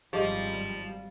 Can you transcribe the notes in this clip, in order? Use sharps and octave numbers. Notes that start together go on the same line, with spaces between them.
G#1 F#2 F3 G3 G4 G#4 D#5